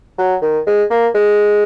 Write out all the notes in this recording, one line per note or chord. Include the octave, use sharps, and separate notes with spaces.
F#3
D#3
G#3
A#3
G#3